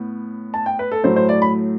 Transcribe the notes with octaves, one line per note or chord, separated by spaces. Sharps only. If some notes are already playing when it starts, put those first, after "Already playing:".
Already playing: A2 B3
A5
G5
B4
A4
A2 F#3 A3 C5
C5
D5
B5